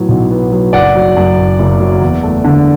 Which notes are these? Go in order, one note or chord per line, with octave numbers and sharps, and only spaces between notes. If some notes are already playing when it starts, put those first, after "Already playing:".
Already playing: A2 F#3 B3
B1
B3
F#3
F#1 D5 F#5
F#3
F#2
F#1
F#1
F#3
E2
A3
D3